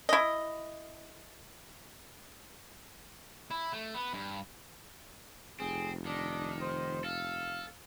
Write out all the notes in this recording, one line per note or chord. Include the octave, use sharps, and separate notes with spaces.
E4 D#5
E4
A3
B3
G2
F1 C4 G#4
D#3 D4
C5
A4 F5